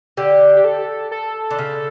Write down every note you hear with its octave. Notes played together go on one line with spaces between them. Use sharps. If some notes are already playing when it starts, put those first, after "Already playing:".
D3 G4
G4
A4
A4
D3
C#3